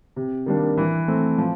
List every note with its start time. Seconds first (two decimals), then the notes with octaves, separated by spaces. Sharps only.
0.16 C3
0.46 D#3 G3 A#3 D4
0.77 E3
1.08 A3 C4
1.38 F3